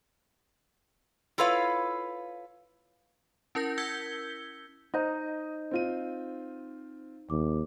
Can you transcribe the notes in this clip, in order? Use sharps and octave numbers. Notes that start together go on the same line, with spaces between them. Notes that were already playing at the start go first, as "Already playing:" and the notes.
E4 F4 A4 B4 C#5 F5
C#4 E4 A#4 G6 A#6
E6 G6 G#6 B6 C#7 G7
D#4 C5 D#5 G6
C4 F4 D#7
D#2 D6